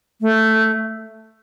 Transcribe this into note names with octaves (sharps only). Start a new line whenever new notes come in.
A3